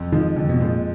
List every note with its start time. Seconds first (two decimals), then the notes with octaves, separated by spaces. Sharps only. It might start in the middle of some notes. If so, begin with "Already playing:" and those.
Already playing: F2
0.12 D#3 F3 G#3
0.36 F2 D3
0.49 B2
0.61 A#2 F3 G#3